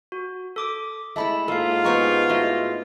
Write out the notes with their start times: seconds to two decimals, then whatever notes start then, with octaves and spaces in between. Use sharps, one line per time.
0.12 F#4
0.56 A4 D6 D#6
1.16 G#3 A3 E4 E5 A5 B5
1.48 G#2 A#3 F4 A4 F5
1.84 G#3 B3 G4 A#5 C#6
2.29 A3 E4 F#4 D#5